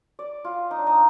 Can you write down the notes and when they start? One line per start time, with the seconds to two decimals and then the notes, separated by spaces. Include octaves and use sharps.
0.19 D5
0.44 F4
0.71 D#4
0.79 D4
0.87 D#4